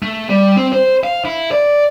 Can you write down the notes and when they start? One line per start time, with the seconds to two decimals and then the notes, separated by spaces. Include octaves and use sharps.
0.02 A3
0.30 G3
0.57 C4
0.73 C5
1.04 F5
1.25 E4
1.51 D5